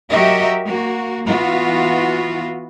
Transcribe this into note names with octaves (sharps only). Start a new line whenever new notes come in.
F#3 F#4 G4 A#4 D#5 E5
A#3 F#4
E3 B3 F4 F#4